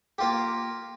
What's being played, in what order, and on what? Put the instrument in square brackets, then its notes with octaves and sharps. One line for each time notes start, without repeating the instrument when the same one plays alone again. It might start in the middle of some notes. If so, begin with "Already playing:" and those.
[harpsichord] A#3 F4 G4